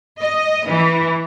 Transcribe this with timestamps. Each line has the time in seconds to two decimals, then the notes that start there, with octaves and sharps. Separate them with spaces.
0.21 D#5
0.68 E3